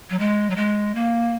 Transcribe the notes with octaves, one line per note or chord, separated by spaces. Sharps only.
F#3
G#3
F#3
G#3
A#3